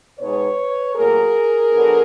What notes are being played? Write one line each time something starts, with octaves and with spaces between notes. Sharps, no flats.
B2 G#3 B3 D#4 B4 C#5
A2 F#3 A#3 G#4 A#4
D3 F#3 B3